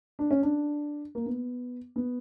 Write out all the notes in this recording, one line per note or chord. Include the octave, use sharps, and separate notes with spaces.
D4
C#4
D4
A#3
B3
B3